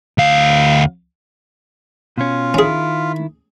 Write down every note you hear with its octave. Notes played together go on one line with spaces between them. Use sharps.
D2 F5
B2 C#4 F4
D#3 C#4 E4 G#4